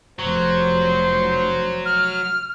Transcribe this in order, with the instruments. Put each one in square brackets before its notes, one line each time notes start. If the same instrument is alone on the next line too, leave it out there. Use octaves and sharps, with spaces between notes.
[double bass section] F1 [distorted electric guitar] F#3 [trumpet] C5
[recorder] F6